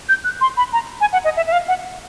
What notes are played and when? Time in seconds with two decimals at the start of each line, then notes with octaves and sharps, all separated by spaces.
0.09 G6
0.24 F#6
0.41 C6
0.57 B5
0.73 A#5
1.01 G#5
1.13 F#5
1.24 D#5
1.37 E5
1.47 E5
1.52 F5
1.68 F#5